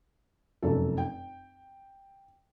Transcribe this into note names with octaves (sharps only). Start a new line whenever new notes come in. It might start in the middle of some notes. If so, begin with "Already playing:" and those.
F1 F#2 A4
G5